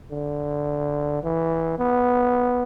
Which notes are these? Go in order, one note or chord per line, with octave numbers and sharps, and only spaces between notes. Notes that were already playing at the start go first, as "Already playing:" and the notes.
D3
E3
B3